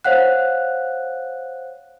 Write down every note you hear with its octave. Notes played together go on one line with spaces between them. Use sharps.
C5 C#5 F5 F#5 F#6